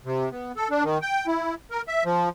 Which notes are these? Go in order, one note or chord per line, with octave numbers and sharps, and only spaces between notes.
C3
B3
A4
D4
D#3
G5
E4
A#4
E5
F3